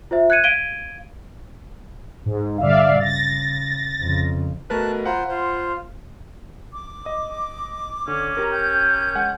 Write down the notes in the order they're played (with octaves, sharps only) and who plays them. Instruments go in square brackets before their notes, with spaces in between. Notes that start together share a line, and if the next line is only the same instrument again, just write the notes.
[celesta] F4 C5 E5
F#6 G#6 C#7 D#7
F5 G#6 D7 D#7 G7
[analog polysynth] G#2
[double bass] G2 D3 [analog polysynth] D5 E5 F5
[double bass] C#3 [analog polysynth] A6 A#6
[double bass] F2 C#3
[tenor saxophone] B2 [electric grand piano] A3 A#4 B4 [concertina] A5 F#6
[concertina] F4 C5 [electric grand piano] F#5 A#5 B5
[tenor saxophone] F4 [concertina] C5
[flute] D6
[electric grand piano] D#5 D#6
[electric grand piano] D3 [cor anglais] C#4
[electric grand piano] G4 A#4 [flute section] A#5
[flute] G5 [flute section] G6
[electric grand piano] G#3 F#5 G#5